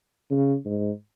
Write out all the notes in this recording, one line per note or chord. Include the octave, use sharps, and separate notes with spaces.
C#3
G#2